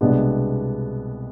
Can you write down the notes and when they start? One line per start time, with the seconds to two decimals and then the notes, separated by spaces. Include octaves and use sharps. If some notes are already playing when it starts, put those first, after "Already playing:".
0.01 C2 B2 G#3 B3 D4